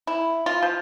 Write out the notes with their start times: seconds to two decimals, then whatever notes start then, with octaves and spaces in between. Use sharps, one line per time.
0.07 E4
0.46 F4
0.63 F3